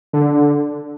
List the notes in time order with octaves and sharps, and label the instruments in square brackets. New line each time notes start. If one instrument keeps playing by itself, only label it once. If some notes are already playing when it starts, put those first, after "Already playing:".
[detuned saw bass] D3